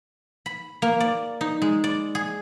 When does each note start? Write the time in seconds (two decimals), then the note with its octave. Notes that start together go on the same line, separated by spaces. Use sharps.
0.46 B5
0.82 A#3
1.00 D5
1.41 D#4
1.62 G#3
1.84 D5
2.15 G#4